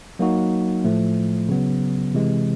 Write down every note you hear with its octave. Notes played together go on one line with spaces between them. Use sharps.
F#3 A#3 D#4 F#4
A2 F3 A3
C#3 F#3 B3
C3 E3 G#3